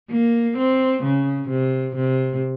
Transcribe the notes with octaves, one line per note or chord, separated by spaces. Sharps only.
A#3
C4
C#3
C3
C3